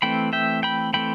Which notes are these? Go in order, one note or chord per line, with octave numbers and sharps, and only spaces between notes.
E3 A3 C4 G5 B5
E5 G5
G5 B5
E3 A3 C4 G5 B5